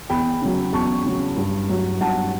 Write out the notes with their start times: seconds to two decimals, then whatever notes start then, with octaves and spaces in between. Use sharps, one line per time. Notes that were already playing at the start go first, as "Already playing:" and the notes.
0.09 E2 G5 B5
0.42 C#3 F#3
0.73 E2 A5 C#6
1.06 C#3 F#3
1.37 G2
1.69 F#3
2.01 G2 F#5 A5